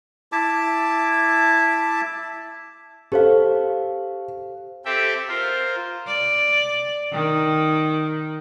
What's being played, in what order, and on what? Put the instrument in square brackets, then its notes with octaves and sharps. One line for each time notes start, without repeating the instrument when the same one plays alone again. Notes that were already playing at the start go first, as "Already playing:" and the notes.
[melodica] E4 E5 A5 D6
[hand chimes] G4 C5 F5 [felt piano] A4
[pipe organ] C4 G4 A4 E5 G5
F4 A#4 C5
[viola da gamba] D5
D#3